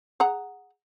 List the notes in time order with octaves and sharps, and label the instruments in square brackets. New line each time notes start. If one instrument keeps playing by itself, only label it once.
[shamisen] G#4 F#5 A#5